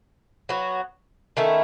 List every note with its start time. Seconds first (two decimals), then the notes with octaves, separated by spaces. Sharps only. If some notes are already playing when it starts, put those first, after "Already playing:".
0.49 F#3 B3 F#4
1.37 D#3 A3 C#4 E4